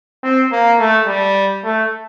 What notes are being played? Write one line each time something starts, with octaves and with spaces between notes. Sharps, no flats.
C4
A#3
A3
G3
A3